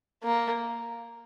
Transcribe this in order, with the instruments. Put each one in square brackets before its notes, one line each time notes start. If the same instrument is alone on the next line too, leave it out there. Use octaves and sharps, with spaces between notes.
[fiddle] A#3